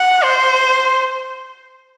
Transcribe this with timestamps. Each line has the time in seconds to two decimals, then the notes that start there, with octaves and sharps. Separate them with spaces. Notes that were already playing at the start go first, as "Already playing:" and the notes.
Already playing: F#5
0.24 C5